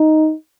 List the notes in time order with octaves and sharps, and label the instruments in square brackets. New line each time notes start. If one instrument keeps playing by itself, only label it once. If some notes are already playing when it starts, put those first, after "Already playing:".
Already playing: [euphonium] D#4